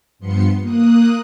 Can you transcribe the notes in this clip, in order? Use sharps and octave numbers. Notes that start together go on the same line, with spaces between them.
G2 F3 B3 C6 C#7
A#3 D#6 F#6